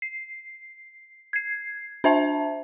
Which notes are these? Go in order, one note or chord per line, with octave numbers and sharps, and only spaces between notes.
C7
G#6 C7
D4 C5 E5 A5